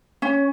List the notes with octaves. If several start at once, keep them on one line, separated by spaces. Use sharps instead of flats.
C#4